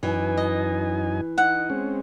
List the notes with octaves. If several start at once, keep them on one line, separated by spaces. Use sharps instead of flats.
F#2 E3 D#4 G#5
D#5
D#4 F#5
G#3 C4 C#4